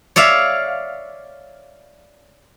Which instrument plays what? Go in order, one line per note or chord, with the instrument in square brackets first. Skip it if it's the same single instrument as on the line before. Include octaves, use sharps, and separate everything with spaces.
[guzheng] C#5 D5 E5 F5